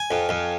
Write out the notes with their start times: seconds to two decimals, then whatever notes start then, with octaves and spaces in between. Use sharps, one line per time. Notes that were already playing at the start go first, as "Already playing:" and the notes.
Already playing: G#5
0.11 F2
0.29 F2